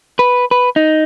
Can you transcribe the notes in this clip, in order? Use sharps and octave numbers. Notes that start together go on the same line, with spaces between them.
B4
B4
D#4